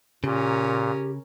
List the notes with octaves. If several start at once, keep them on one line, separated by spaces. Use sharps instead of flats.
A#2 C#3 C#4 G4 A#4